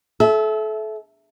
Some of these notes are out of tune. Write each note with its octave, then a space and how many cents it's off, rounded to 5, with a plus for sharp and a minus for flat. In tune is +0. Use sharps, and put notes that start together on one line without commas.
A4 -30 E5 +0